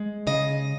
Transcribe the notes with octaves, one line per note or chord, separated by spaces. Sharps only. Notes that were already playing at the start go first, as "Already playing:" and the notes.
Already playing: G#3
C#3 D#5